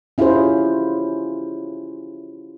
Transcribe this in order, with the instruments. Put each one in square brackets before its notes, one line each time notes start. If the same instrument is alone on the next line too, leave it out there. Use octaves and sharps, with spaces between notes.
[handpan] C#4 E4 F4 G4 G#4 C5